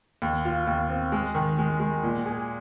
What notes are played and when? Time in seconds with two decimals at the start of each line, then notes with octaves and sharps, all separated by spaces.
0.22 D#2
0.45 F4
0.67 D#2
0.90 C4
1.12 G#3
1.35 D#3
1.58 G#3
1.80 G#3
2.03 A#2
2.26 G#4